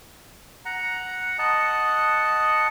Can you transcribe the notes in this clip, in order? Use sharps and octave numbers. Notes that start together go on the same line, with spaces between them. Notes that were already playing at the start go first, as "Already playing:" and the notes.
F#5 A#5
D#5 F#5 A5